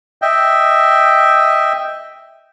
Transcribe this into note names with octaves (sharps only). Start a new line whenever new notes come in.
D#5 E5 G5